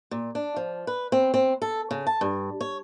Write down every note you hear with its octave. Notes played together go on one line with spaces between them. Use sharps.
A#2
D4
F3
B4
C4
C4
A4
C#3
A5
G2
C#5